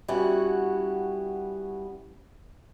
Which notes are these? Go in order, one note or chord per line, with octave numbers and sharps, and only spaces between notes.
G3 B3 C#4 E4 F#4 F#5